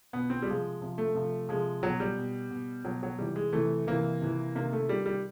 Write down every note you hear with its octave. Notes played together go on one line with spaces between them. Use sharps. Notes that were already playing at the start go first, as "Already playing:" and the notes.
B2 B3
C4
G3
C3 F3 G#3
C3 F3
A3
C3 F3
C3 F3 G#3
B2 F#3
G3
B2
B2
B2 F#3
F#3
C3 E3 G3
G#3
C3 E3 A3
C3 E3 A#3
C3 E3
C3 D#3 A#3
A3
C3 D#3 G3
G3